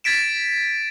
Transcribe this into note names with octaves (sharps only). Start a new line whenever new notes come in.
G#6 A6 B6 D7 E7